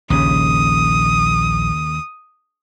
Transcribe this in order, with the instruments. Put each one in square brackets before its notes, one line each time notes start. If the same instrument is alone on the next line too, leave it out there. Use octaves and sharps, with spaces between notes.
[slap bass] A#1 [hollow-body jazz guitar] D#2 C#3 [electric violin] D#6